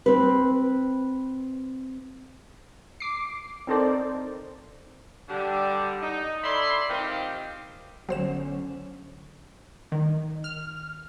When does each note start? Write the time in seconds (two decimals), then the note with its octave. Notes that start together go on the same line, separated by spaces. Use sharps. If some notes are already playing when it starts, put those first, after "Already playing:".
0.06 C4 B4
3.00 D6 C7
3.67 C4 D#4 A4 A#4 C5 D5
5.29 D3 G3 D4
6.01 D#4
6.44 E4 A4 D5 B5 C6
6.89 D#3 F3 C4 D#4 F4 G4
8.09 G1 D3 F#3 C#4 C5 E7
9.92 D#3
10.44 F6